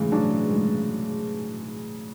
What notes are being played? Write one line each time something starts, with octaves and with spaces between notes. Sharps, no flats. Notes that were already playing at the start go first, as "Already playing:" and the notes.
Already playing: A2 C#3 E3 G#3
F#3 D4
G#3